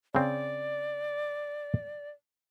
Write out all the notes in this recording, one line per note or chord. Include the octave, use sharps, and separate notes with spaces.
C#3 C4 D5